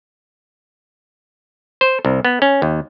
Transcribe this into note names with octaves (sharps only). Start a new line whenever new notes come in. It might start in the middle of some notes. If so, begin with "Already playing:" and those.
C5
C2
B3
C#4
D#2